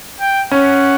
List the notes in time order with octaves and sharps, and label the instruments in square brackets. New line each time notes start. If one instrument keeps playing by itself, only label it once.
[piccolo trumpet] G5
[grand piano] C#4 [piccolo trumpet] F#5